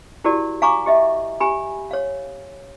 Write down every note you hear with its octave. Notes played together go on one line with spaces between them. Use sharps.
E4 F#4 G4 A#4 D5
F5 G#5 A#5 C#6 D6
G4 D#5 E5
G4 G#5 B5
C#5 F5